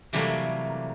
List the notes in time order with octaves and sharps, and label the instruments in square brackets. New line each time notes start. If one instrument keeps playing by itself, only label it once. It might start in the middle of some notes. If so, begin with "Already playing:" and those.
[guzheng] C3 E3 F#3 G3 A3 A#3